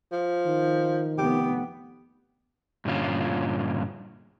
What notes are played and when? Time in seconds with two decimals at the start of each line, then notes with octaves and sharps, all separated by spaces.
0.12 F3
0.47 D#3
1.18 F1 B3 G4
2.85 G2 A#2 D3 C#4 F4